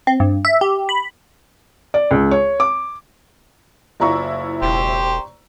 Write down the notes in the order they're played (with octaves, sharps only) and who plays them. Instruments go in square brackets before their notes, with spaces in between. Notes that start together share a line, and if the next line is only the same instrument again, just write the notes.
[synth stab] C4
G2
E5
G4
B5
[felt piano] D5
C#2
C#5
D6
[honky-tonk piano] F#1 E4 F4 [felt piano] D5 A#5 C#6
[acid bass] E1 [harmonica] G4 C5